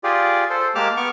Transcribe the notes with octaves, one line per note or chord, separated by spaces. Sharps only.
F4 G4 G#4 D5
A4 C5
G#3 A#3 G4 A5 D6 F6
B3 C#6 D6 F6